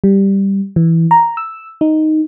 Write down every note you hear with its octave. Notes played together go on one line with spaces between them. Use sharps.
G3
E3
A#5
E6
D#4